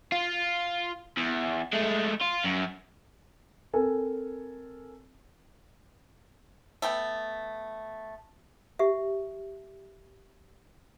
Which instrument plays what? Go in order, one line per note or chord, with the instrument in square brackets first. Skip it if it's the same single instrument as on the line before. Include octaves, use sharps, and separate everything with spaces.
[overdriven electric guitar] F4
E2
G#3 A3
F4
F#2
[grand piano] C4 A4 A#4 G#5
[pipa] A3 B3 G5
[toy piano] G4 E5